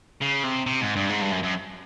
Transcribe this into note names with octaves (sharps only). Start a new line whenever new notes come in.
C#3
C3
C3
G#2
G2
G#2
G2
F#2
F#2